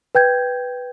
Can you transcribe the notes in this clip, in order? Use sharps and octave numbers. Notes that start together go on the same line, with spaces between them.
B4 G5 G6 G#6